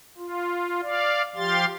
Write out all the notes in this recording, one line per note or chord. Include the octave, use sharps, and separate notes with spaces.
F4
D5 F5
F3 G4 F5 C6 A6